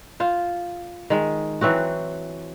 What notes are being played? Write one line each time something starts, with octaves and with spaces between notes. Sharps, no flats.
F4 C5
D#3 G#3
E3 F#3 C4 F#4